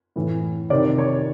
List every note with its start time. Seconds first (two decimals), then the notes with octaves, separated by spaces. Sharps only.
0.16 A2 E3
0.70 C3 D#3 D5
0.98 C#5